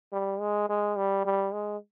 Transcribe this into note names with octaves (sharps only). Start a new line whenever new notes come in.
G3
G#3
G#3
G3
G3
G#3